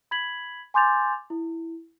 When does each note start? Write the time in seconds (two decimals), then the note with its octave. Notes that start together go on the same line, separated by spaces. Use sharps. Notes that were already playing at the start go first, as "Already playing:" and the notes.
0.11 B5 G#6 B6 F#7
0.74 G#5 C6 D6 G6 A6 F7
1.30 E4